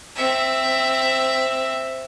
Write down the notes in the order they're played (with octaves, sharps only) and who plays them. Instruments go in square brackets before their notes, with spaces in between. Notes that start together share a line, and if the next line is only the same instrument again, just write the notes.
[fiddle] C4 E5